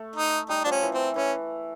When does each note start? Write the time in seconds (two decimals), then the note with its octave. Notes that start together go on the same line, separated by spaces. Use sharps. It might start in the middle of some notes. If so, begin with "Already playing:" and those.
Already playing: A3
0.15 D#4
0.49 G3 D#4
0.64 F3 D4
0.71 C#4
0.83 E3
0.94 C4
1.16 E3 C#4